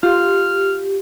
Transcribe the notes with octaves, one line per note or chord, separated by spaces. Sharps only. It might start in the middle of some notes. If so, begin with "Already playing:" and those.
F4 G4 F6